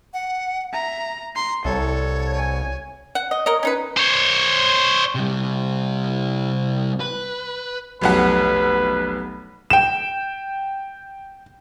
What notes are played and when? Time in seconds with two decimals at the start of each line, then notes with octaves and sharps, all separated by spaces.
0.13 F#5
0.73 E5 A#5
1.36 A#5 C6
1.65 C2 A4 C#5
2.34 G#5
3.15 F#5
3.31 D#5
3.46 A#4 C#5 D#5
3.63 C#4 D#4 B4
3.97 C5 C#5
5.15 C3 G3
7.00 B4
8.02 F1 B1 B4 F#5
9.70 G5 E7